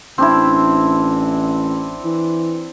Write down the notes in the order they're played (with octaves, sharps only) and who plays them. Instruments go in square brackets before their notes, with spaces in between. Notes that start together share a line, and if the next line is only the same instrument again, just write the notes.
[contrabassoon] A1 [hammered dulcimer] C4 D4 E4
[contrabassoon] E3